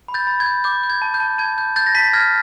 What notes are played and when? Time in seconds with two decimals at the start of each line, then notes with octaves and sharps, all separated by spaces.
0.08 B5
0.14 G6 A6
0.27 B5
0.40 G#6
0.46 G6
0.64 D6 G6
0.84 G6
0.90 G#6
1.02 A5
1.14 G6
1.20 A5
1.38 A5 G#6
1.58 G6
1.76 G6 A6
1.86 A#6
1.95 A5 A6 B6
2.13 F6 G#6 A#6